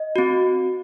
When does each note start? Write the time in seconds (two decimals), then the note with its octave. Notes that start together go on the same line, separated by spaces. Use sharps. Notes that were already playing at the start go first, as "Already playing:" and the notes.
Already playing: D#5
0.16 C4 F#4